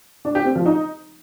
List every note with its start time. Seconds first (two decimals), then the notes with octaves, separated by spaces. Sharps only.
0.25 D4
0.35 G4
0.45 C4
0.55 F3
0.66 D#4